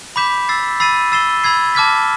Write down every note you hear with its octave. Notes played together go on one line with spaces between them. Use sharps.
B5 D6 G6 B6 E7
E6 A6 C7
B5 E6 A6 C7 D#7
E6 A6 C7 E7 G7
B5 E6 G#6 C7
A5 D6 F6 G#6 B6